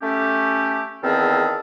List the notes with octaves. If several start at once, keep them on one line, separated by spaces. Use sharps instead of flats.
A3 C#4 G4
E2 D#3 C4 G#4 A4 F5